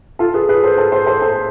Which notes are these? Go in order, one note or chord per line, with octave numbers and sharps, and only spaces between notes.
F4 A4
G#4 B4
G#4 B4
A4 C5
A4 C5
A4 C5
A4 C5
A4 C5